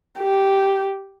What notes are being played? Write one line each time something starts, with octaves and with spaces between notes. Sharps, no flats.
G4